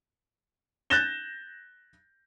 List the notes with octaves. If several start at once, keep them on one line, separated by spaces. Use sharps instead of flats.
F#6 G6 A6 A#6 E7 G7